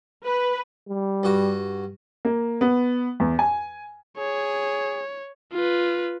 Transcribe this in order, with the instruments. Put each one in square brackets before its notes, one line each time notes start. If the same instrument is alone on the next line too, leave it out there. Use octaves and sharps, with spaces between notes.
[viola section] B4
[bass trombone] G3
[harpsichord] G2 F#4
[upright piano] A#3
B3
E2
G#5
[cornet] G#4 [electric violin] C#5
[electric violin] F4 B4